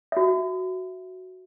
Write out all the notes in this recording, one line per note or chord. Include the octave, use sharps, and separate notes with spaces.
F#4 E5